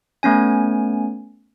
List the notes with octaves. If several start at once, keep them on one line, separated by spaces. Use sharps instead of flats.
A3 B3 C#4 G#5